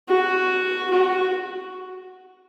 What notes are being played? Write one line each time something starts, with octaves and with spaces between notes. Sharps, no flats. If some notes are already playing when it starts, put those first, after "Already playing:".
F#4
F#4